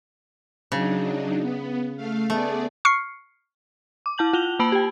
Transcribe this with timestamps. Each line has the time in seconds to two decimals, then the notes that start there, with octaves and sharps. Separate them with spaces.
0.72 C#3 F#3 D4 D#4
1.41 B3
1.97 A3 F5
2.30 A3 B3 G#4 D5
2.85 C#6 F6 C7 C#7
4.06 D6
4.18 E4 A5 G6 F#7
4.33 F4 F7 G7
4.59 A#3 A5 B5 E6 D7 F#7
4.72 G4 G5